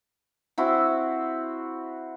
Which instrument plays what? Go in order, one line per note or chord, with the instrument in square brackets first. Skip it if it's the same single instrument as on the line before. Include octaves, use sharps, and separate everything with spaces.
[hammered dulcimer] C4 E4 F#4